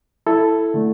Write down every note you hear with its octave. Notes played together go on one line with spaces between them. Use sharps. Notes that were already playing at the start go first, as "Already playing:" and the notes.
E4 A4
D3 A3